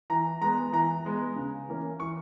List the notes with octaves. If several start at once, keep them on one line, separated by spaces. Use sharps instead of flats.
E3 A#5
G#3 B3 A#5
E3 A#5
G#3 B3
C#3
E3 A#3 C#4
E3 C#6